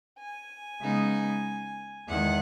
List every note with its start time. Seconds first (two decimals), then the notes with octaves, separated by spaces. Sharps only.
0.19 G#5
0.82 C#3 G#3 B3 D#4
2.09 E2 D#3 G#3 F#5